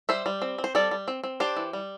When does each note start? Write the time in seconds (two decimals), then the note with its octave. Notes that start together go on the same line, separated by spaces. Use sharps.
0.09 G3 C5 E5
0.26 G3
0.42 C4
0.58 C4
0.64 C5
0.75 G3 A4 D5
0.91 G3
1.08 C4
1.24 C4
1.40 D4 G4 C5
1.56 E3
1.73 G3